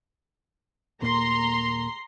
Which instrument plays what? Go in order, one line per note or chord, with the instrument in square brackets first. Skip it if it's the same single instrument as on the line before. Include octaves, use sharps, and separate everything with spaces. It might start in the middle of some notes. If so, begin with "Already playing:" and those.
[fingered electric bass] D#1 A#2 A#3 [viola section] A#5 C6